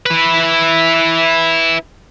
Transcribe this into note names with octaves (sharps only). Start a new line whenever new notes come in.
E4 B4